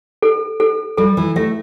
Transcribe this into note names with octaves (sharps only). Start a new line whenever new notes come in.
A4
A4
G3 A4
E3
A3 E5